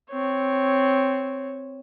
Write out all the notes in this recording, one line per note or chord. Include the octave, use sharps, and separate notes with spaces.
C4 C#5